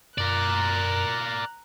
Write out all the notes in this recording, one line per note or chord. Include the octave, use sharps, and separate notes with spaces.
F#2 A#4 D5 A#5 F#6